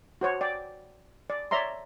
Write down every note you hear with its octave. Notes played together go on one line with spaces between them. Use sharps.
F#4 C5 C#5
D5 G5
D5
C#5 D5 E5 A#5 C6